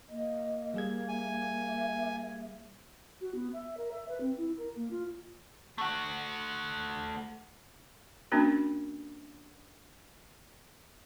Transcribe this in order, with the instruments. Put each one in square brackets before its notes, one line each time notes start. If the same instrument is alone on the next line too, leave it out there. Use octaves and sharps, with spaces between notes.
[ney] A#3 [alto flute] D#5
[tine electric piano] G3 G#4 G#6
[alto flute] E5 [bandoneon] G#5
[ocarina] F#4
B3
E5
A#4
E5
B4
C4
E4
A#4
A#3
F4
[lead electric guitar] A3 F#5
[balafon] A#3 C#4 D4 F#4 A#4